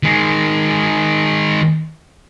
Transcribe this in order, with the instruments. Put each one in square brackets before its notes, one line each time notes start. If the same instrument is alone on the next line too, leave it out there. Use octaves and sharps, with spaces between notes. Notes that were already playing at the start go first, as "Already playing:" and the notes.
[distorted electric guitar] D#3 G#3